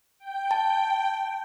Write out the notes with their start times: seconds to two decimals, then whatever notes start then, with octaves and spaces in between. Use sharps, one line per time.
0.19 G5
0.51 A5